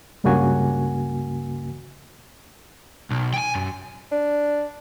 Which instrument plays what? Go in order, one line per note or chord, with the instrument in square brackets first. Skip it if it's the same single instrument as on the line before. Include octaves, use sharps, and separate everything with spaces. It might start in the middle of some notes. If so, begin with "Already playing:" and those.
[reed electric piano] C#2 G2 C#3 A#3 F#4 G#5
[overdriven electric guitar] B1
G5 G#5
F#2
[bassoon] D4